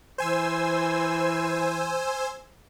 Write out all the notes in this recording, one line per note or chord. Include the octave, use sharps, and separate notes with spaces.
E3 C5 G#5 E6